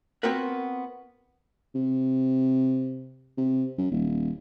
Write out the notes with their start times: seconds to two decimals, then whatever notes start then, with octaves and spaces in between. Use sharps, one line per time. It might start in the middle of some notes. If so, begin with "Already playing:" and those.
0.23 B3 C4 F4 F#4 A#4 B4
1.75 C3
3.38 C3
3.78 F#2
3.91 D#1